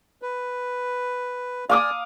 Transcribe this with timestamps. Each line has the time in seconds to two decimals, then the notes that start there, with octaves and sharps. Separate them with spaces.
0.22 B4
1.69 D5 F5 G#5 D6 D#6